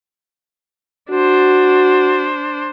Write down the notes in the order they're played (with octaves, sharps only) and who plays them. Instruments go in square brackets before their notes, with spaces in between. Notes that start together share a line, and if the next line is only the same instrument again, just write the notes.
[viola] D4 C5 [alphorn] F#4